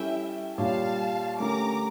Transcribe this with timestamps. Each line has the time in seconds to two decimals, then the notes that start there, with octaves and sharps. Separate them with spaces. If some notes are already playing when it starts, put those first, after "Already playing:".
Already playing: G3 C#4 E4 A4 E5 G5
0.57 A#2 G3 D4 G4 C#5 F5 A5
1.39 D3 A3 C#4 G4 A#4 A#5 D6